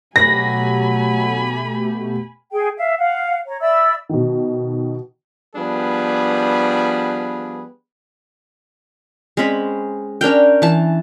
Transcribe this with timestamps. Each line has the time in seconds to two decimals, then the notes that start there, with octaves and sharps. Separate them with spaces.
0.16 B2 F#3 A3 G4 G#5 B5 A#6
2.52 G#4 G5
2.77 E5 F5
2.98 F5 F#5
3.47 C#5 A#5
3.61 D5 E5 B5 E6
4.09 B2 D#3
5.56 F3 G3 B3 D4 G#4 B4
9.37 G#3 C4 C#4 B5
10.21 C#4 D4 A#4 G5
10.62 E3 A5